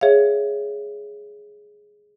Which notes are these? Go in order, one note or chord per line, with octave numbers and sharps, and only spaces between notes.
G#4 C#5 E5 F5